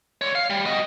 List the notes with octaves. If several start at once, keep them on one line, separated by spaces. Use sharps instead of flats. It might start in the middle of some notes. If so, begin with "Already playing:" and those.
D3 C#5
F5
G3
F#4 D#5